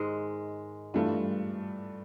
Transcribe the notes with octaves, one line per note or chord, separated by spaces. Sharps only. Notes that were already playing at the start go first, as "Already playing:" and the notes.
Already playing: G#2 D#3 G#3
G2 E3 A3 D4 F4